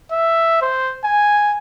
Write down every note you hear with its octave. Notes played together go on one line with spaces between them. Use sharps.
E5
C5
G#5